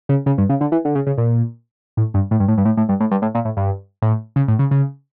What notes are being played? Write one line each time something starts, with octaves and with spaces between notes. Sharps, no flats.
C#3
C#3
G2
C#3
D3
E3
D3
C#3
C#3
A#2
A2
G2
A2
G2
A2
G2
A2
A2
G2
A2
G2
A2
A#2
A2
G2
A2
C#3
A2
C#3
C#3